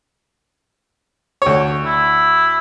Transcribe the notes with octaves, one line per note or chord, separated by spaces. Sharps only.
D2 C#5
E4